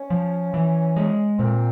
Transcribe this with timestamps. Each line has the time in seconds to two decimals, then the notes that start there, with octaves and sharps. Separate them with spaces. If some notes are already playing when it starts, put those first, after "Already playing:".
Already playing: C#4
0.10 F3
0.54 E3
0.96 G#3
1.39 A#2 C4